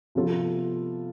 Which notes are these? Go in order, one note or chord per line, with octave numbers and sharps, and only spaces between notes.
C3 F3 B3 F4 A4